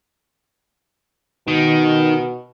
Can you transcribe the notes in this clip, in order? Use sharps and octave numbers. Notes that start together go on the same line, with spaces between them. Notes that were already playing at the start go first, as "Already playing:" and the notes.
B2 D#3